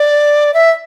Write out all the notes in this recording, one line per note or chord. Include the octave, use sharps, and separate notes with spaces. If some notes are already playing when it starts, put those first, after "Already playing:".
Already playing: D5
E5